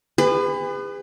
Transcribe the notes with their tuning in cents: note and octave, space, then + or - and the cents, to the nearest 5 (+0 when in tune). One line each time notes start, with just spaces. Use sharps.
G#4 -40 B4 +25